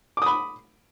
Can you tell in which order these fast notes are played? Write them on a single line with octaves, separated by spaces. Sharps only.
D6 D#6 B5